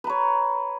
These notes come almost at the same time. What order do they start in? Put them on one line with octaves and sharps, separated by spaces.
B4 A#5 C#5